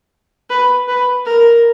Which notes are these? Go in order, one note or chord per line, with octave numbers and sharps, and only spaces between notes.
B4
B4
A#4